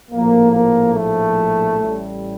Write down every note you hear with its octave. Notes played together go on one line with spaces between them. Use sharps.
A#1 A2 F3 A#3
A#3
A3
A1 A2 G3